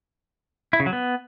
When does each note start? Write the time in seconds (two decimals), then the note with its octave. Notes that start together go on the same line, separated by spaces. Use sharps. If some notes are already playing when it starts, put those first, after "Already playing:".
0.73 E4
0.80 C#3
0.86 F#3
0.93 B3